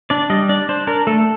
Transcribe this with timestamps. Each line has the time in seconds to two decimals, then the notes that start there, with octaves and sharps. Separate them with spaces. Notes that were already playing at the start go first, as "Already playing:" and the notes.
0.10 D4 D5
0.30 G3 D#5
0.49 D4 D5
0.69 D4 C5
0.87 D4 A#4
1.07 A3 A4